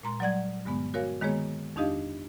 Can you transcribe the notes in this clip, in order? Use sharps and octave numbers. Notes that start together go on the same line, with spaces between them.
A#2 G#3 A#5 C6
F#3 G3 D5 F#5 G#6
G2 D3 G#3 B3
F#4 A#4 C#5 F5 G#5
D#3 G#3 A#3 B3 G#4 C#5
F2 D4 D#4 G4 D#5 F5